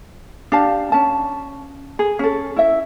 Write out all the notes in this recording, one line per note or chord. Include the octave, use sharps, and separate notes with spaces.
D4 G4 F5 A5
C#4 A5
G#4
C#4 A4
E4 E5